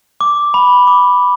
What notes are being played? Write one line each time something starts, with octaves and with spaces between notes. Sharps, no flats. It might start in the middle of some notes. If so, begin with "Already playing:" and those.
D6
B5
D6